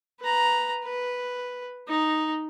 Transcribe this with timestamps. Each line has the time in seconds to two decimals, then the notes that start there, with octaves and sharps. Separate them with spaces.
0.20 B4 A#5
0.84 B4
1.88 D#4